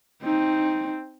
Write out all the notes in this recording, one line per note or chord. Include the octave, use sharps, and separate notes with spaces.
C4 D#4